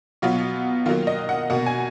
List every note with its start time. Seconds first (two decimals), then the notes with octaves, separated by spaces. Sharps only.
0.22 B2 F#3 B3 F4
0.86 D#3 F#3 A#3 F4
1.07 D#5
1.29 F#5
1.50 B2 A#3 F#5
1.66 G#5